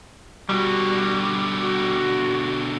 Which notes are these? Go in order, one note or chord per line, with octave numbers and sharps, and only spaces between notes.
B2 D3 G3 F#4
F#4